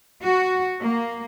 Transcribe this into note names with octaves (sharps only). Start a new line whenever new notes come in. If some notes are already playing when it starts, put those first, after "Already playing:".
F#4
A#3